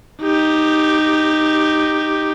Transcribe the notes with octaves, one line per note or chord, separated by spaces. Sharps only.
D#4 G4